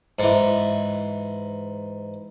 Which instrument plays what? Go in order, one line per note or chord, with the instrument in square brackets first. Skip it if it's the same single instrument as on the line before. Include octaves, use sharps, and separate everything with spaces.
[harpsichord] G#2 E3